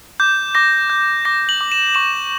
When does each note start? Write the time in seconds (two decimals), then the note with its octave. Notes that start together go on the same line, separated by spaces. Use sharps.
0.20 D6 G6
0.55 D6 A#6
0.90 G6
1.25 D6 A#6
1.49 F#7
1.61 D6
1.72 E7
1.95 C#6 E7